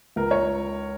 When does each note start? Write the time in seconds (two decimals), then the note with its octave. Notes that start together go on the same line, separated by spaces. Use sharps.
0.16 C#2 A#4
0.31 C#5